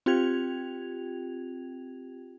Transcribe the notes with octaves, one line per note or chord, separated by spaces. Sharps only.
C4 F4 G4 G5 G#6 F7